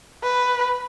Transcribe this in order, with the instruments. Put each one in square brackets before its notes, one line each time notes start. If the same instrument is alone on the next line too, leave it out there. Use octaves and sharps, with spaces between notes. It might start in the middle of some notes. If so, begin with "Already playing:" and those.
[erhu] B4